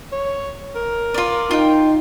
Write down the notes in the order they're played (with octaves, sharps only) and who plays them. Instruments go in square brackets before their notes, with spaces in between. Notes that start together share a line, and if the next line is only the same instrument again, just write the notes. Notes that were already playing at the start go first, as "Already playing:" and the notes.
[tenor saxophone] C#5
A#4
[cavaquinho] F4 D5
[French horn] D#4 [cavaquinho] F4 G5